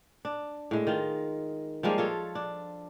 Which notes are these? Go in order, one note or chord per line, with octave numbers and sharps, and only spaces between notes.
D4
A2 G#3
D#3 F4
F3 G3 G#3 A#3
F4 A4 C#5
D4